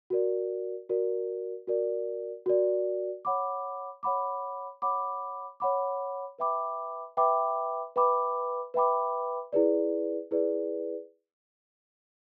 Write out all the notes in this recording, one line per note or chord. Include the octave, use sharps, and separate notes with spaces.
F#4 A#4 D5
F#4 A#4 D5
F#4 A#4 D5
F#4 A#4 D5
C#5 F#5 B5 D6
C#5 F#5 B5 D6
C#5 F#5 B5 D6
C#5 F#5 B5 D6
B4 E5 G5 B5 D6
B4 E5 G5 B5 D6
B4 E5 G5 B5 D6
B4 E5 G5 B5 D6
E4 G#4 B4 D5
E4 G#4 B4 D5